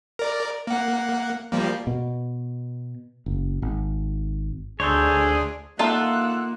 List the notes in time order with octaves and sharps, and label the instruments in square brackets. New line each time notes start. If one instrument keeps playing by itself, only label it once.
[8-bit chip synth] A#4 D5
A#3 F#5
F3 G3 A#3
[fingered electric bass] B2
F#1
G#1
[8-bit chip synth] D2 D4 [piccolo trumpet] G#4 [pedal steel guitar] A4 C5 C#5
[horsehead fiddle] A#3 [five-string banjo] D#4 A4 E5 [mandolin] F4 [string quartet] F#5 E6 F#6